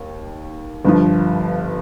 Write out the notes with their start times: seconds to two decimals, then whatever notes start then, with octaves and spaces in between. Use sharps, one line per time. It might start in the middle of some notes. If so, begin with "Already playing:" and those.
Already playing: D#2 D#3
0.85 G1 G2 F3